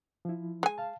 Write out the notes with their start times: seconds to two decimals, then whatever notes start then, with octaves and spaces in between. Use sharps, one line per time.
0.25 F3 E4
0.63 G#3 G#5
0.78 F5 A5